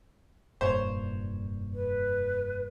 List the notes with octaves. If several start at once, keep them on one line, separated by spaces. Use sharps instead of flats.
F1 G2 A#2 C5 C#5
B4